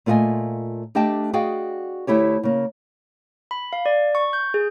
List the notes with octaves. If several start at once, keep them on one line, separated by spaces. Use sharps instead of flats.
A#2 A3 F4 G4 D#5 G#5
A3 D4 G4 D#5 G5 A5
F#4 G#4 D5 D#5 F5 G5
D2 A3 E4 G4 C#5
C#3 A#3
B5
F5
D5
C#6
G6
G#4